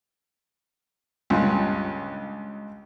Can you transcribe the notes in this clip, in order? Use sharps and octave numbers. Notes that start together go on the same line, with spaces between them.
C#2 G2 A#2